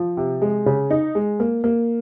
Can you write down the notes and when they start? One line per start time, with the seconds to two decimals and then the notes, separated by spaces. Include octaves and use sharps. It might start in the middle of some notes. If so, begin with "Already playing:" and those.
Already playing: F3
0.17 C3
0.42 G#3
0.66 C#3
0.90 D#4
1.15 G#3
1.40 A#3
1.64 A#3